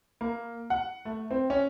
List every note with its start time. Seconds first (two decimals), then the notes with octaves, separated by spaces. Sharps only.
0.21 A#3
0.70 F#5
1.05 A3
1.31 C4
1.50 C#4